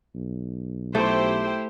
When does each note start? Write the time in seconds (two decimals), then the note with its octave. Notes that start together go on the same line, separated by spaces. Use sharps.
0.15 B1
0.95 A3 E4 G4 C5